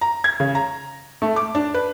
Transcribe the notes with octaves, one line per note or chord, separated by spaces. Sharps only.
A#5
G#6
C#3
A#5
A3
D6
D4
B4